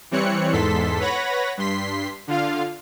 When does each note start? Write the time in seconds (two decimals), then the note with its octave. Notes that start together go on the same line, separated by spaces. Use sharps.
0.11 E3 G3 C4 C#5 F#6 C#7
0.52 E2 G#2 A4 C6 B6
1.00 B4 C#5 F#5 B5 A#6
1.57 G2 C6 B6 C7
2.27 D3 F4 F5